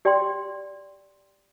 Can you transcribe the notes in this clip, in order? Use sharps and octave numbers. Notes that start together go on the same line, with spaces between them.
G4 D5 G5 C6